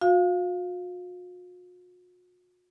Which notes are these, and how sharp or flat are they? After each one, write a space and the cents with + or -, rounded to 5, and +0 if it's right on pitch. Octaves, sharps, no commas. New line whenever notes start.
F#4 -45 F5 +0